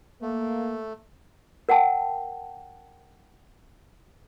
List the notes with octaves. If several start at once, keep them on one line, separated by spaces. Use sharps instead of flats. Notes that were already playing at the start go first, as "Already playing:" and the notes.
A3 A#3
A#4 F#5 G5 A5